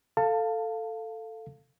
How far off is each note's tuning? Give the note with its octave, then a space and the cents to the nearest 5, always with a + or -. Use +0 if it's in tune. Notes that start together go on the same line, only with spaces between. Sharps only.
A4 +10 F5 +0 A5 +25